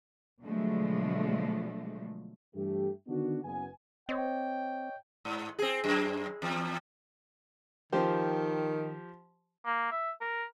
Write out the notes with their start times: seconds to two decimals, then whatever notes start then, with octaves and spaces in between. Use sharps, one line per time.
0.42 B2 D3 F3 F#3 G#3 A3
2.55 G2 E3 A3 G4
3.08 D3 D#3 B3 D4 F#4
3.44 F#1 B3 G#5
4.09 C4 C#5 D#5 G5
5.25 G#2
5.59 C4 G#4
5.84 F#2
6.42 E2
7.92 D#3 F3 G4 C5
9.65 A#3
9.91 E5
10.21 A#4